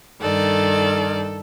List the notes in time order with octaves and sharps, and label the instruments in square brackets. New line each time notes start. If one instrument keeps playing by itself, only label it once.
[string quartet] G2 D#3 D5 [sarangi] A4